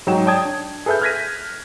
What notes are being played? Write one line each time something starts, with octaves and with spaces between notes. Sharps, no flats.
G#2 F#3 D#4 G5 E7
C#5 D5 G5 A5 D#6 G#6
D4
G#4 A4 B4 E5 F6 G6
F6 F#6 G#6 A#6 B6 D#7